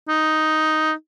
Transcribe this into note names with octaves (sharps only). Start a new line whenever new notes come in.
D#4